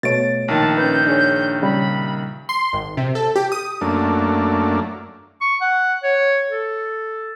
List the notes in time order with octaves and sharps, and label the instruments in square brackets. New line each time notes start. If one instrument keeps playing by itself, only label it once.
[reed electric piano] B2 A3 C#5 [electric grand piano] A6 D7
[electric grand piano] A#1 D#3 [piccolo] A5
[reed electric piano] C#4 B4 [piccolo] G6
[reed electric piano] D4 G#4 C#5
[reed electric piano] C#3 G3 [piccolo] B5
[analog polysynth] C6
G#1
C3
A4
G4
D#6
[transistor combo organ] F#2 A3 A#3 D4
[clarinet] C#6
F#5
C#5
A4